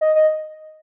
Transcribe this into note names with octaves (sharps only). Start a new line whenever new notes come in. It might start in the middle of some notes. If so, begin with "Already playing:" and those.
D#5
D#5